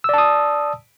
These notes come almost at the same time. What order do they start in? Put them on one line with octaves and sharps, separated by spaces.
E6 D5 A5 D#6